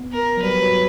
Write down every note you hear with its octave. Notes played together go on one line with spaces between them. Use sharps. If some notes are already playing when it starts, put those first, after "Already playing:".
Already playing: B3
A#4
F#3
G3 B4
F#3